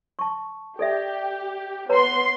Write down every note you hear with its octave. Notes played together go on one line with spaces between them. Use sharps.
A5 C#6
G4 A4 D5 E5
B3 B4 C#5 A#5 C6